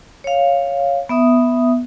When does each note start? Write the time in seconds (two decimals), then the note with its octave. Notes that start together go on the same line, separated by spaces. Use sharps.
0.24 C#5 F5
1.09 B3 E5 D#6